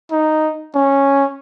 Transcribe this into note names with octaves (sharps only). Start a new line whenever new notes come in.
D#4
C#4